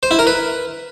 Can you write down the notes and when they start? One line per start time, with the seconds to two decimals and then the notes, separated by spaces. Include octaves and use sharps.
0.03 C5
0.11 E4
0.19 A#4
0.27 B4